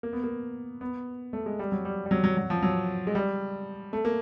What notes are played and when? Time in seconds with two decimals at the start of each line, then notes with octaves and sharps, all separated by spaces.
0.03 A#3
0.13 B3
0.24 A#3
0.81 B3
1.33 A3
1.46 G#3
1.59 G3
1.72 F#3
1.85 G3
2.06 G3
2.11 F#3
2.24 F#3
2.37 F#3
2.50 F3
2.62 F#3
3.07 G#3
3.15 G3
3.93 A3
4.05 A#3